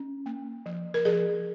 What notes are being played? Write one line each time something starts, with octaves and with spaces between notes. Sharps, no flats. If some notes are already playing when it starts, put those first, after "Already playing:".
Already playing: C#4
A#3
F3
A#4
F3 G#4